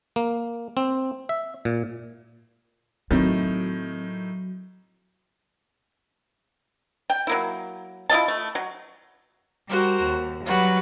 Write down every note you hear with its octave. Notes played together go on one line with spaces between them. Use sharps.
A#3
C4
E5
A#2
A2 D#3 F#3 C4
G5
F#3 A#3 E4
E4 F4 D#5 A5
A3
F#3
G3 F#4 A#4 C5
D#2
F#3 G3 F#4 B4